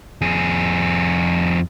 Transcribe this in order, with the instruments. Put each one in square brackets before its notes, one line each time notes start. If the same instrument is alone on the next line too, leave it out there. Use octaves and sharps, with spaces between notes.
[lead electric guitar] F2 G#4